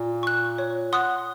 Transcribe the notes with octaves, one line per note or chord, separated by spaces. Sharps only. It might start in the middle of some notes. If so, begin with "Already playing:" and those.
Already playing: A#2
C#6 F#6
C#5
F#5 C6 D#6 F#6